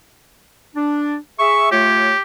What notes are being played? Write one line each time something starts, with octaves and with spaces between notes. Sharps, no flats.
D4
G#4 E5 C#6
A3 F4 G4 C#5